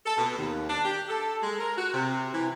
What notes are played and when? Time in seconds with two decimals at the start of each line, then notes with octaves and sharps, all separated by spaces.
0.05 A4
0.17 B2
0.36 D#2
0.69 D4
0.84 G4
1.08 A4
1.42 G#3
1.58 A#4
1.76 F#4
1.93 C3
2.33 E3